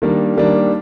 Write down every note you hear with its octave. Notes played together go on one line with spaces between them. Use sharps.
D#3 G3 A#3 D4
D#3 G3 A#3 D4